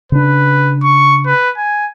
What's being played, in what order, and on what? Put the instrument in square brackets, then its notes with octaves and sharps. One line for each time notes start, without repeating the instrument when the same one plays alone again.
[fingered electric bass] C#3 D4 [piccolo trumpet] B4
[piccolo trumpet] C#6
B4
G#5